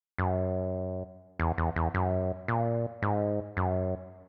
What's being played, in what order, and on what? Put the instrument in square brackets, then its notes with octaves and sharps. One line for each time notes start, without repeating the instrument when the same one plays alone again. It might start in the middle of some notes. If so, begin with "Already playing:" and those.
[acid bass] F#2
E2
E2
E2
F#2
A#2
G#2
F#2